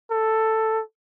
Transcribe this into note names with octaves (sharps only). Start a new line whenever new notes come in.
A4